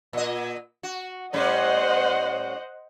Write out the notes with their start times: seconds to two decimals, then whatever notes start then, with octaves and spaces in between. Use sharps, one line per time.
0.13 A#2 D#5
0.83 F#4
1.33 A2 G3 C#4 C5 D#5 F#5